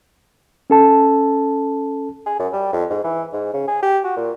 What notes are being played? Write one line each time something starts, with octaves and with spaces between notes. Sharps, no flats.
C#4 A4 A5
G#4
F#2
G3
F2
G#2
E3
G#2
C#3
G#4
G4
F#4
A#2